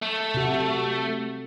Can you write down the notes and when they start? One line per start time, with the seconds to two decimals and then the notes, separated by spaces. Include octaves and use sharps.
0.02 A3
0.34 C3 F#4